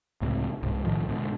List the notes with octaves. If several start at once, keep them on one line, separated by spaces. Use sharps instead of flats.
C#2 A2 C3
C2 G#2
B1 A2 D#3 F3
G#2 B2 D3